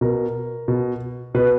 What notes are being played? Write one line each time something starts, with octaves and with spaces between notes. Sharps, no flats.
B2 A#4
B2
B2 B4